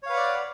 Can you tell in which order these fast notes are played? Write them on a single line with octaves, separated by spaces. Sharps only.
C#5 F5 B4 F#5 D5